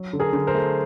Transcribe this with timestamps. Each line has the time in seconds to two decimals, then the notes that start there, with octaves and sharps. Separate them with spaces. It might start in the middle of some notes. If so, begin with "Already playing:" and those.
Already playing: F#3
0.13 D3
0.20 G#4 A#4
0.33 D3
0.47 A#4 C5
0.54 A3